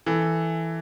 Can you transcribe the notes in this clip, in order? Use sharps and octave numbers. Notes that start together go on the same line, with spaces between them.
E3 A4